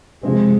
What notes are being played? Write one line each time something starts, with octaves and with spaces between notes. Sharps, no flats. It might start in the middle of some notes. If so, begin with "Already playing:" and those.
C3 F3 G#3 C4